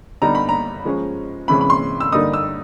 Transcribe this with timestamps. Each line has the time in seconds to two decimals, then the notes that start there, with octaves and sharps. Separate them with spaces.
0.22 D3 G3 B3 D#4 A#5
0.35 B5
0.49 A#5
0.85 F3 G#3 C#4
1.48 C3 E3 G#3 C#4 B5
1.61 B5
1.70 C6
2.00 E6
2.12 D3 G3 A#3 D#4 D#6
2.34 E6